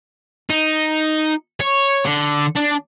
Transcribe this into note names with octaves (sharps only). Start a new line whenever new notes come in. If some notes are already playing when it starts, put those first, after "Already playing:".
D#4
C#5
D3
D4